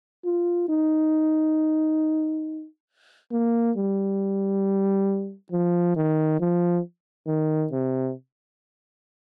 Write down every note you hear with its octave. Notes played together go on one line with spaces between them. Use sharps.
F4
D#4
A#3
G3
F3
D#3
F3
D#3
C3